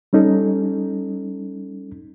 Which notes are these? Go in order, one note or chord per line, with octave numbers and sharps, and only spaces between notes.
G3 C#4 D#4 A4